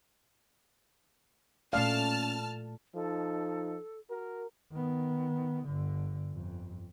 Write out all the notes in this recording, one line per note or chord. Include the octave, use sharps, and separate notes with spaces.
A#2 A3 C#4 D5 F5 A5 F6
F3 D#4 A4
F#4 A#4
D#3 B3
G1 D3
G1 F2